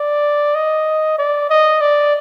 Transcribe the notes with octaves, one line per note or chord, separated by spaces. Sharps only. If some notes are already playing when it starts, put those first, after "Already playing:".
Already playing: D5
D#5
D5
D#5
D5